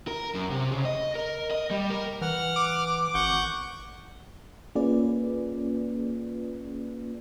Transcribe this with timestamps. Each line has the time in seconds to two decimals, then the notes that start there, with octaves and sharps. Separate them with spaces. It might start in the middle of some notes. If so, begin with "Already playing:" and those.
0.07 A#4
0.35 F#2
0.51 C3
0.71 C#3
0.85 D#5
1.15 A#4
1.51 D#5
1.71 G3
1.90 A#4
2.21 E3 F#5 F6
2.56 D6
3.14 G#1 F#5 C#6 G6
4.75 A#3 C#4 F4 G#4 B4 D5